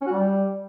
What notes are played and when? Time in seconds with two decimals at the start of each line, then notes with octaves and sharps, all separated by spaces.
0.02 C#4
0.07 F#4
0.12 G3